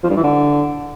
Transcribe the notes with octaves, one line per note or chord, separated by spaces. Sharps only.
F3
G2
E3
D3